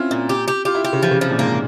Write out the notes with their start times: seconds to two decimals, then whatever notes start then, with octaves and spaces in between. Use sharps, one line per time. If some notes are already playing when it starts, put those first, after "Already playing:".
Already playing: C4 C#4 E4 F4
0.11 A#2
0.29 G4
0.48 G4
0.65 F4 G4
0.74 E4
0.84 G4
0.93 C#3
1.03 E3 F3
1.11 C#3
1.21 C3 F3
1.30 A#2
1.39 G#2 A#3